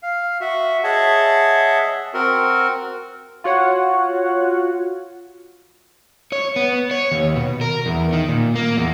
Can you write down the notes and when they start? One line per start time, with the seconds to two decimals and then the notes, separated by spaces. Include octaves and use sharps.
0.03 F5
0.41 F#4 E5
0.84 G#4 C#5 D#5 E5 F#5 A5
2.14 C4 F#4 A#4
3.44 F4 F#4 C#5 F#5
6.32 C#5
6.56 B3
6.91 C#5
7.11 D#2
7.36 B2
7.61 A#4
7.86 E2
8.13 D#3
8.29 A#2
8.55 A#3
8.77 E2